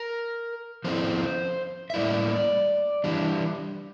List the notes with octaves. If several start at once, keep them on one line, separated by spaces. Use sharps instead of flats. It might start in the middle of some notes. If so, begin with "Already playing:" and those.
Already playing: A#4
F3 C4 E4 C5
E5
A2 G3 A#3 E4 D5
E3 G3 D4